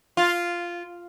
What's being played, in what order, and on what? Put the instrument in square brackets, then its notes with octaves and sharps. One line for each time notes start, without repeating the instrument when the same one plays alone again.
[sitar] F4